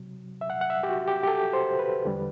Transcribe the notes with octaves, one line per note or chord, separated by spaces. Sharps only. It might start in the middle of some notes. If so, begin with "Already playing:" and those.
Already playing: C3 F#3
E5
F#5
F#5
E5
G4
F#4
G4
G4
A4
C5
B4
E2 D3 G3